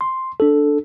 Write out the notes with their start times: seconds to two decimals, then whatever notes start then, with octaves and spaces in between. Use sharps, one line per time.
0.01 C6
0.40 D4 A4